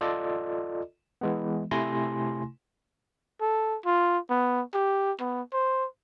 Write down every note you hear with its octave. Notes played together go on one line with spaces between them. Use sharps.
F4 A4 D5 D#5
E3 G#3 B3
C3 A3 E4 G#5 C6 A#6
A4
F4
B3
G4
B3
C5